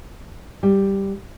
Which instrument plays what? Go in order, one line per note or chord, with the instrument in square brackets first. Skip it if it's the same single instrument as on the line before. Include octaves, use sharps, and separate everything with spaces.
[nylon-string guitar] G3